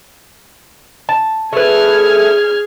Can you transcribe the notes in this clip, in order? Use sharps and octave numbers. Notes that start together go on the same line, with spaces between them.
A5
A3 G#4 B4 F6 G#6